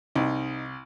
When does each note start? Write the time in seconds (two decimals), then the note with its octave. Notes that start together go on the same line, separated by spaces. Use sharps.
0.15 C2 D#4